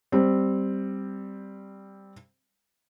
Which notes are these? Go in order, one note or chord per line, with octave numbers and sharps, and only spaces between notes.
G3 C4